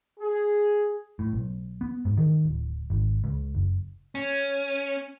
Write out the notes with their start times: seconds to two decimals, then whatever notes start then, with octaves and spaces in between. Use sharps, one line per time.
0.19 G#4
1.19 A2
1.33 B1
1.81 B3
2.05 G#2
2.17 D#3
2.45 D1
2.90 G#1
3.24 C#2
3.55 F#1
4.15 C#4